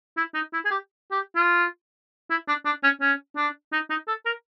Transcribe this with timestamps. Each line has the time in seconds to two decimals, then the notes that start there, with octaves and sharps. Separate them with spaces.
0.17 E4
0.34 D#4
0.53 E4
0.65 G#4
0.71 G4
1.12 G4
1.35 F4
2.30 E4
2.48 D4
2.65 D4
2.83 C#4
3.01 C#4
3.36 D4
3.73 D#4
3.90 D#4
4.08 A4
4.26 A#4